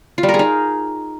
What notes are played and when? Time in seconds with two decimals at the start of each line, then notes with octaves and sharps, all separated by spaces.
0.18 F4
0.23 G3
0.29 A#4
0.34 G#4
0.39 D#4